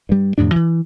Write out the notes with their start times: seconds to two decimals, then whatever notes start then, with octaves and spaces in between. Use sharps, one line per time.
0.09 G2 G3
0.38 F2 A2 C3 D4
0.56 E3